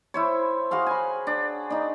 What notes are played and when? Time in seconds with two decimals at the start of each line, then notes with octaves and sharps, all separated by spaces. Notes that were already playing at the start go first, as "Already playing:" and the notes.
0.14 E4 C5 C#5
0.71 F#4 G#4 F5 C6
0.87 G#5 B5
1.27 D4
1.70 D4 D#4